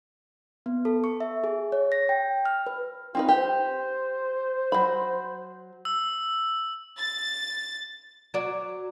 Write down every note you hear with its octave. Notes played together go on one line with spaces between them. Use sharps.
B3
A4
C#6
E5
G#4
C#5
A#6
G5
F6
B4
C4 D#4 F4 B4
G4 C5
F#3 B5
E6
A6
F#3 F#4 D5